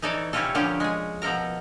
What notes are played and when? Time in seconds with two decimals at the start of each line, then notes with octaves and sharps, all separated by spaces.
0.02 E3 D#4 A4 C#5 D5
0.33 C3 G3 C#4 E4 F4 A4
0.55 A#2 D3 F3 C#4 G4 D5
0.80 G#3 G#4
1.22 B2 F3 A4 A#4 A#5